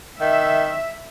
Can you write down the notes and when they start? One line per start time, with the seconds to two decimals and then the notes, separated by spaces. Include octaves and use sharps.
0.20 D#3 E5